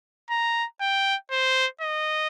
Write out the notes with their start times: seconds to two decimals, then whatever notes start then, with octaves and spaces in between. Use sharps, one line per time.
0.30 A#5
0.81 G5
1.31 C5
1.81 D#5